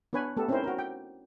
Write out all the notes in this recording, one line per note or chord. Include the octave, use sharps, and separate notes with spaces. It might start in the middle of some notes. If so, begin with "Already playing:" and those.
B3 D4 B4 C#5 G#5
A3 B3 G4 A4
C4 C#4 D#4 E4 A#4 C5
F#4 A#4
G5